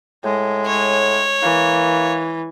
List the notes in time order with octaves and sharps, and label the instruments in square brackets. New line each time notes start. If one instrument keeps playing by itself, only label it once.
[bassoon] A2 [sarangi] G#3
[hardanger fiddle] C#5
[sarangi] E3 [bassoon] A#3